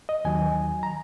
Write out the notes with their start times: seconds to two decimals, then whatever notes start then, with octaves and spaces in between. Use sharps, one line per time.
0.09 D#5
0.25 D#2 D#3 F#3 G#5
0.83 A#5